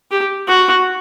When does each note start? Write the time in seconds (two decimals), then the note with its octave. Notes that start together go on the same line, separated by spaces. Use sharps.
0.11 G4
0.48 F#4